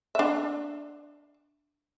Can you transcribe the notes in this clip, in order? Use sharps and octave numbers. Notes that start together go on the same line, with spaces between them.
D4 E5